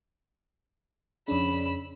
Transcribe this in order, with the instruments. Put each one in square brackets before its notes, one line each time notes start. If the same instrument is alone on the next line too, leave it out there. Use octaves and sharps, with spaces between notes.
[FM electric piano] F2 D4 [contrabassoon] C#3 [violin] B5 E6